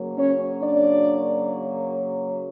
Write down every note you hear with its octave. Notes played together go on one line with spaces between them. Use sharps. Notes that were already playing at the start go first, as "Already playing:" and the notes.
Already playing: C#3 F#3 A#3
C#4 C#5
D4 D5